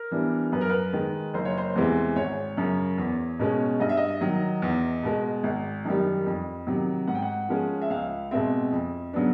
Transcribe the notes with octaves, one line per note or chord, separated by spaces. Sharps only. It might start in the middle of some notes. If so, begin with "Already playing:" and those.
Already playing: A#4
E3 G3 B3 D4
F#2 B4
A#4
B4
D#3 G#3
F#1 C5
C#5
C5
E2 C3 E3 G#3
G#1 C#5
F#2 C#3
E2
B2 G#3 C#4
G2 D#5
E5
D#5
D#3 F#3
E2
B2 G#3
G#1
F#2 D#3 G3
F2
C3 D#3 F#3
G#2 F#5
G5
F#5
F3 G#3 C#4
E5
C#2 F5
B2 G#3 C4 E5
F2
C#3 F#3 B3 D4